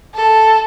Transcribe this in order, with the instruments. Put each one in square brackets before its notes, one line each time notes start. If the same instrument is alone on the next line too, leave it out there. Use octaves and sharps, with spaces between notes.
[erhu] A4